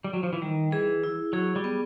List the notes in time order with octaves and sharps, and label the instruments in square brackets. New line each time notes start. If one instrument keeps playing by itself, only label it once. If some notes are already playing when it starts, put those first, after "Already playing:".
[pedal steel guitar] G3
F#3
F3
E3
[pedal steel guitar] D#3 [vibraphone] G3
[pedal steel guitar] E3 [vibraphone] G#4
[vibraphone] E4
[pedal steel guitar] F#3 [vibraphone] G#4
[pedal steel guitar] G3
[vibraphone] B3